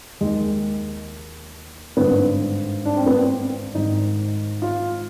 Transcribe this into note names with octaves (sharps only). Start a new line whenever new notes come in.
D#2 D#3 G#3
G#1 G2 D3 B3
D4
C4
B3
C4
G#1 G#2 D#3 D#4
F4